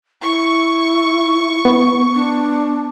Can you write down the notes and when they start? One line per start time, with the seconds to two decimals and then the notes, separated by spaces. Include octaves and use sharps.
0.22 E4 C#6
1.65 B3
2.15 D4